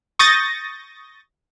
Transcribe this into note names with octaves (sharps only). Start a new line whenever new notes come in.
C#6 D#6 G6 A6 A#6